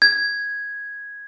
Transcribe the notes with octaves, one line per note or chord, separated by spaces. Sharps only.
G#6